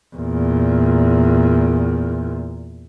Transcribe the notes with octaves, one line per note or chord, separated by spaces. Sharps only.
E2 A#2